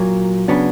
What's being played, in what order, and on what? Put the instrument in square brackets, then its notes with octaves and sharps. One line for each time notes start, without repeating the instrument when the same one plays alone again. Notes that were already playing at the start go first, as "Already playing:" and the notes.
Already playing: [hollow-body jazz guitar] A#2 F#3 A#3
C#3 F#3 B3 D4